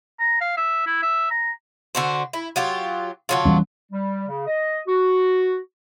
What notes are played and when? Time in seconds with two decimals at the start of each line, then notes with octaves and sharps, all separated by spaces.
0.20 A#5
0.41 F5
0.57 E5
0.87 E4
1.03 E5
1.30 A#5
1.95 D3 F#4 C5
2.33 E4
2.56 F#3 F4 G4
3.29 D3 F#3 F4
3.45 E3 G3 C#4
3.92 G3
4.28 C#3
4.47 D#5
4.87 F#4